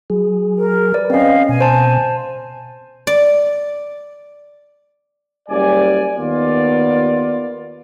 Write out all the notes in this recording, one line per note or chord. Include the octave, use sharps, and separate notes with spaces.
F#3 G#4
A#4
B4 D5
C4 C#4 D#5 F5
B2 G#5
C5 A5
D5
F#1 G3 D5 G#5
D#2 B3 F4 D5